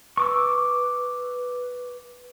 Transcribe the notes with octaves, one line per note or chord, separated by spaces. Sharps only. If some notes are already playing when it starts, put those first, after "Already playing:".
B4 C#6 D6 E6